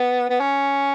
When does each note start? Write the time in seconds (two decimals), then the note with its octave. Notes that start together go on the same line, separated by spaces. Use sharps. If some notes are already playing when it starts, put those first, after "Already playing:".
Already playing: B3
0.30 B3
0.40 C#4